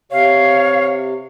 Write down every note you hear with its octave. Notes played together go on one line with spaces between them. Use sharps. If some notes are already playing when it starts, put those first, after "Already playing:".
C3 C#5 F5